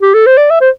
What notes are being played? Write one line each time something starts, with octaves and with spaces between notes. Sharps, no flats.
G4
A4
C5
D5
E5
C5